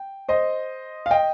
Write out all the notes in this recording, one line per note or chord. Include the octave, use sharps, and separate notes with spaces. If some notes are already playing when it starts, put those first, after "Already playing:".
Already playing: G5
C5 D#5
F5
D#5 G5